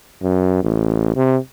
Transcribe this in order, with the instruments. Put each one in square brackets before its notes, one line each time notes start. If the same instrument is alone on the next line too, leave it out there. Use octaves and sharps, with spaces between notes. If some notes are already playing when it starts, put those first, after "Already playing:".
[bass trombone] F#2
A1
C3